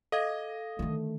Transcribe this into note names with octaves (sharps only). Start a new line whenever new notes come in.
A4 D#5 F5 G#6
D3 D#3 A3